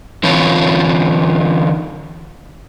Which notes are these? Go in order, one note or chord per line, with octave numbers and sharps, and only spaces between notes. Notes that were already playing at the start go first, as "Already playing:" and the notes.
D3 E3 C4 F4 C#5 A5